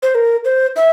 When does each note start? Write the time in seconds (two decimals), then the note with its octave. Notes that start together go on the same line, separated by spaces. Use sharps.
0.03 C5
0.15 A#4
0.45 C5
0.76 E5